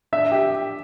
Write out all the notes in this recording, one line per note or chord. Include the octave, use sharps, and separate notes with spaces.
D4 E5
G4